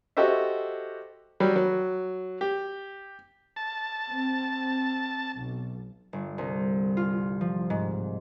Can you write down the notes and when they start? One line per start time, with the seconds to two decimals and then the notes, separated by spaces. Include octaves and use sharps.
0.17 F#4 G4 A4 C5 D#5 E5
1.40 F#3 G3
1.56 F#3
2.41 G4
3.56 A5
4.09 C4
5.34 B1
6.13 G1
6.38 C2
6.97 F4
7.41 F3
7.70 G#2